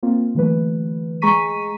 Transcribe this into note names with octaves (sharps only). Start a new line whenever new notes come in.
A#3 C4 F4
D3 E3 F#3 A3 B4
G#3 G#4 A#5 C#6 B6 D#7